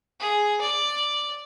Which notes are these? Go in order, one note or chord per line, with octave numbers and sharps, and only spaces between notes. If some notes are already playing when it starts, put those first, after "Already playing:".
G#4
D5